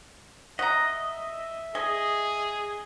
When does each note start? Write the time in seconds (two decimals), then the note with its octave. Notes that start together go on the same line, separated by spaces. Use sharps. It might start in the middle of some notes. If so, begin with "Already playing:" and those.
0.59 D#5 E5 F#5 A#5
1.75 G#4 D#5 G#5